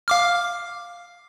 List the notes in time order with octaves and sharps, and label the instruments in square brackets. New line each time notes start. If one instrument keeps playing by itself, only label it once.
[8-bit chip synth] F5 D6 F6